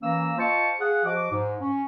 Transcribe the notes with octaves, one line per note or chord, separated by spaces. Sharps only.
E3 A#3 C#4 F5 A#5 E6
F4 C5 D#5 F5 A5 C#6
G#4 F5 F#5
F3 F#4 D#5 D6
G#2
C#4